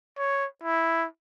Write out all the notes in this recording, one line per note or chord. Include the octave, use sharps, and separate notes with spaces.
C#5
E4